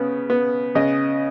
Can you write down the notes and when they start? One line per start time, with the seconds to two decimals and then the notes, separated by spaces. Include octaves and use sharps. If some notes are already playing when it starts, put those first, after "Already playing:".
Already playing: C#3 B3
0.30 B3
0.75 C#3 D#5